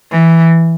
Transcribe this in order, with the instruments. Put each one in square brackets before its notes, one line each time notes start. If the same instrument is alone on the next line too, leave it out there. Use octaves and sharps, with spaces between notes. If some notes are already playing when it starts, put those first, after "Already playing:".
[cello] E3